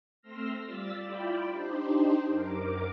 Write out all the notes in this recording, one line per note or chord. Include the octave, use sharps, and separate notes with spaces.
A3 C4 C6 E6 F6 A#6
G3 F4 D5 E6 A6 B6
E4 F4 D5 G5 B5
D4 D#4 G4 C5
F#2 A#4 D6